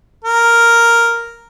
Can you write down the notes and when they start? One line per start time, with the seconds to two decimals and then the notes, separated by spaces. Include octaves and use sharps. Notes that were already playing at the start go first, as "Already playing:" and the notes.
0.24 A#4